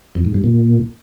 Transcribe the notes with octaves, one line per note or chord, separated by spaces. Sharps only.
F2
G#2
G2
A#2